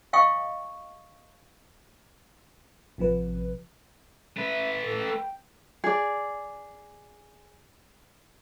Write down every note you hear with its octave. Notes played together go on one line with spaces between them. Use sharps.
D#5 F5 G5 C#6 D#6
A1 C3 F3 B4
A3 B4 E5
A2 A4
G5
G#4 D5